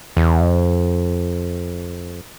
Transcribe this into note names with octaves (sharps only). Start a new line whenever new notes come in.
E2
F2